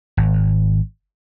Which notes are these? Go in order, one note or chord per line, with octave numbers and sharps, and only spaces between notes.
G#1